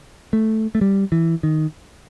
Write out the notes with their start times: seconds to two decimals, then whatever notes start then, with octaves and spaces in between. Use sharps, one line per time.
0.33 A3
0.75 A3
0.81 G3
1.12 E3
1.43 D#3